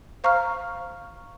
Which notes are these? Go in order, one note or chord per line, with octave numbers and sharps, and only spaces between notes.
C5 F5 A#5 C#6 F6